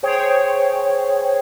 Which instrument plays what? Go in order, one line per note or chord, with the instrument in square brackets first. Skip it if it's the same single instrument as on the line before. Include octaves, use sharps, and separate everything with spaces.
[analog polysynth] G#4 C5 C#5 G5